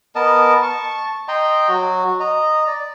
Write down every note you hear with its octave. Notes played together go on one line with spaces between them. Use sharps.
B3 A#4 D#5 A5
A5 C#6
D#5 G5 A#5 C6
F#3 F#4
D#5 A#5
D5